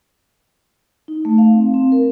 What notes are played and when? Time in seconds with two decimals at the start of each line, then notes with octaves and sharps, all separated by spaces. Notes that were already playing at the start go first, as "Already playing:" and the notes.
1.08 D#4
1.25 A3
1.38 F5
1.54 C4
1.74 C4
1.92 A#4